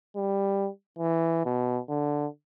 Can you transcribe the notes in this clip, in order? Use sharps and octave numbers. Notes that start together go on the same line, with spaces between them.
G3
E3
B2
D3